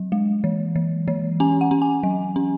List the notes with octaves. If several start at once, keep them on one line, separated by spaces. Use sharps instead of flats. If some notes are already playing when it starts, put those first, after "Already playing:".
Already playing: F#3
G#3
E3
E3
E3
C#4 G#5
F#5
C#4
G#5
F#3
C#4